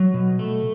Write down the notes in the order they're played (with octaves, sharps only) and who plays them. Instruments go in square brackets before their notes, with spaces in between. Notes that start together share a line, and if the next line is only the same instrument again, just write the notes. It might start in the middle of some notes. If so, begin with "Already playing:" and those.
Already playing: [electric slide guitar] F#3
B2
A3